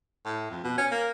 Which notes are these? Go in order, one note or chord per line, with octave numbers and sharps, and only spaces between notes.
A2
F2
B2
C#4
A#3